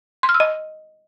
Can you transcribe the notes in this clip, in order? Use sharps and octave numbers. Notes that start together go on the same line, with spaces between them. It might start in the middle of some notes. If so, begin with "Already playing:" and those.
C6
F6
E6
D#5